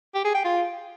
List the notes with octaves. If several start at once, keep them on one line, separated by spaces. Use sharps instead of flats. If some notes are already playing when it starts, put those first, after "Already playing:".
G4
G#4
G5
F4